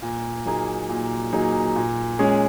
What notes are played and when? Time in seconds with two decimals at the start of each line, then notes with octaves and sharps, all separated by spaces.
0.02 A#2
0.45 F#3 A#3 D#4 G#4
0.89 A#2
1.32 F#3 A#3 D#4 G#4
1.75 A#2
2.19 G#3 C#4 G#4